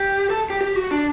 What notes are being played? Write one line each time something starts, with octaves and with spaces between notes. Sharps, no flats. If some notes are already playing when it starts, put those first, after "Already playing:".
Already playing: G4
A4
G4
G4
F#4
D4